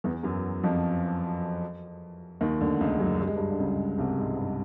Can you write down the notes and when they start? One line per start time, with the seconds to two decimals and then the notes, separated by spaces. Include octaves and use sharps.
0.04 E2 E3
0.23 F#2 F#3
0.63 F2 F3
2.41 D#2 D#3
2.61 D2 D3
2.81 C#2 C#3
3.00 F#2 F#3
3.20 G3
3.27 G#3
3.36 G2 G3
3.51 D3
3.59 C#2 C#3
3.98 C2 C3
4.18 G#2
4.37 G2